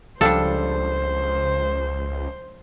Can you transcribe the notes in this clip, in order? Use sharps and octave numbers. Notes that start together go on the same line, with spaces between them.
C#2 F3 G3 D4 A4 C5